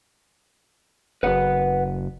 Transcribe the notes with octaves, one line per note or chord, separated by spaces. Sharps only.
F#1 B4 F#5